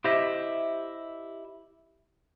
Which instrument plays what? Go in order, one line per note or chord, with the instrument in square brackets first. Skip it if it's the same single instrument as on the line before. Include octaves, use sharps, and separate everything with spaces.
[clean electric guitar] E4 G4 C5 D#5 E5